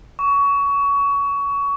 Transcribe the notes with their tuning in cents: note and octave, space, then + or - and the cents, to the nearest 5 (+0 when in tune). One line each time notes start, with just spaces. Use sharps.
C#6 +25